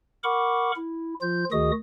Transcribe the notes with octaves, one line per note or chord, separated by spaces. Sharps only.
A#4 F#5 B5 C#6 D6
E4
F3 F4 G6
D2 D#3 F#4 G#4 D#5 D#6